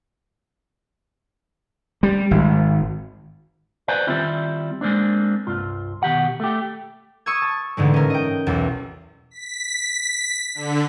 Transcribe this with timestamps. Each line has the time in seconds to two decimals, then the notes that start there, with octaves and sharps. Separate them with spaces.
2.03 G3
2.31 G#1
3.88 B4 C5 D5 G#5
4.07 D#3 G3 A3 C4 E4 F4
4.81 G#3 A#3 C4 D4
5.47 C2 G2 F4
6.03 B2 D#3 G4 F#5
6.40 A3 G4
7.26 C#6 D#6 E6 G#6
7.42 A5
7.77 A1 G#2 D3 G#3
7.94 C#4 A#4
8.10 D#5 G5
8.47 B1 E2
9.31 B6
10.55 D3